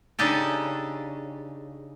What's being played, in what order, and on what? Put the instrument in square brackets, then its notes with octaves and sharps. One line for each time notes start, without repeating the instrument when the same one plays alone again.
[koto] C#3 D4 D#4 G4 A4